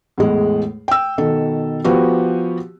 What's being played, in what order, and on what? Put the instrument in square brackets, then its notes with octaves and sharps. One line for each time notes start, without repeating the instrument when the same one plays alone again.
[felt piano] E2 A2 G#3
G5 E6
B2 D#3 A4
F3 B3 F#4 G4